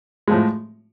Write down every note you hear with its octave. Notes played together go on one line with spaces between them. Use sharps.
A2 F3 G#3